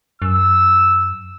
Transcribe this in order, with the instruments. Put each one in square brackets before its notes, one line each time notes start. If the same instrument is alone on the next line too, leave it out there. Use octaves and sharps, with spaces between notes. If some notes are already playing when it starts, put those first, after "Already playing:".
[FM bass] F#2 [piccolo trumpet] E6